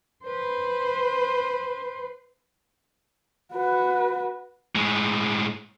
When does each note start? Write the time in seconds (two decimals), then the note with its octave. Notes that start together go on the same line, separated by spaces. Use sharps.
0.24 B4 C5
3.53 F#4 B4
4.75 A2 G#3